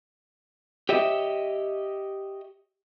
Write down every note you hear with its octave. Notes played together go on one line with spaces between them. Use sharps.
G4 C#5 D#5 E5